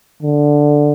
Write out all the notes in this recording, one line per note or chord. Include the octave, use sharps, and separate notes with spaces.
D3